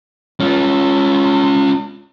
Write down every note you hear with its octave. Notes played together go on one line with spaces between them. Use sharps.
C#4 F4